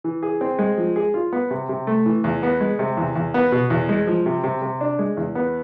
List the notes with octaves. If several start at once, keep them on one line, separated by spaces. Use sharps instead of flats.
E3
G#4
C4
G#3
F3
G#4
F4
B3
C3
C3
A3
E3
E2
B3
G#3
C3
E2
E2
B3
B2
E2
G#3
F3
C3
C3
C3
D4
G#3
E2
B3